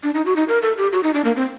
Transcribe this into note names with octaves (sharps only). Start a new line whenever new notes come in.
D4
D#4
F#4
D#4
A#4
A4
G4
F#4
D#4
D4
A#3
C4